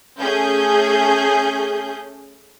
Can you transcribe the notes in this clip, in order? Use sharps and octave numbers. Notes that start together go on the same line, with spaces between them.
A3 C#4 G#4 G6